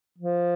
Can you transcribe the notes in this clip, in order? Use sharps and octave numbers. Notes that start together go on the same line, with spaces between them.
F3